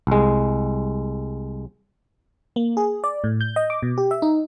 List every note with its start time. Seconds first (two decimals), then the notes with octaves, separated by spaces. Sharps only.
0.07 C2 G#3
2.56 A#3
2.77 G#4
3.04 D5
3.24 A2
3.41 G6
3.56 D#5
3.70 D6
3.82 B2
3.98 G4
4.11 E5
4.22 D#4